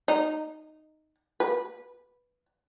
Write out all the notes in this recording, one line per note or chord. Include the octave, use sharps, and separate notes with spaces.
D#4
B4